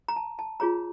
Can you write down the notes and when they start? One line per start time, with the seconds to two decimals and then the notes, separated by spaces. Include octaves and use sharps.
0.08 A#5
0.16 A5
0.39 A5
0.60 F4 G#4 C#5 A#5